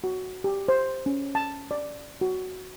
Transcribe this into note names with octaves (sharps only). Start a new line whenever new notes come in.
F#4
G4
C5
C#4
A5
D5
F#4